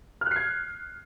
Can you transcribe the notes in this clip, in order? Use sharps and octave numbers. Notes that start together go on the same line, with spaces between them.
F6 F#6 G#6 C7